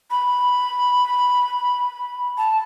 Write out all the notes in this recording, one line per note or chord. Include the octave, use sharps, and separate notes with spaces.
B5
A5